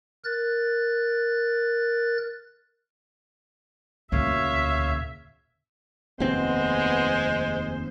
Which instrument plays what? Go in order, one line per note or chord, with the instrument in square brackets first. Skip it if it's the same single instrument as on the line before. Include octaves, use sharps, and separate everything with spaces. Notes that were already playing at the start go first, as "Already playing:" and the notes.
[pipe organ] A#4 F#6 A6
[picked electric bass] E1 A#2 C#3 [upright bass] D2 [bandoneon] C#5 F5 [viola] E5
[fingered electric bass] F1 D#2 C4 [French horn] G#3 [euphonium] B3 [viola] C5